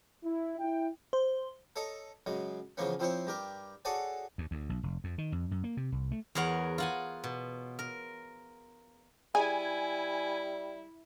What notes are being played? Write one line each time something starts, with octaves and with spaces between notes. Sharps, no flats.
E4
E4 G5
C5
A4 C#5 D#5 A#5
F#2 C#3 G#3
C#3 E3 F3 A#3 B3 C#4
F3 C4 E4 C5 C#5
G2 G4 A#4
F#4 G#4 A4 C#5 D5 G#5
D#2
D2
B1
F1
F2
D#3
F2
F#2
A#3
C3
C2
A3
E2 G#4 A#4 C#5 F#5
F4 F#5 G#5
B2
A#4
G3 E4 G#4 G#5